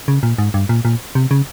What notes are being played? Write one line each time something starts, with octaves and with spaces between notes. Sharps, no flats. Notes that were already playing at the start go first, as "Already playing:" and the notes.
C#3
A#2
G#2
G2
A#2
A#2
C3
C#3